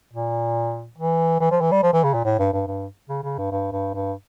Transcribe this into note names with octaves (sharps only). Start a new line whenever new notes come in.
A#2
E3
E3
F3
E3
G3
F3
E3
C#3
A#2
A2
G2
G2
G2
C#3
C#3
G2
G2
G2
G2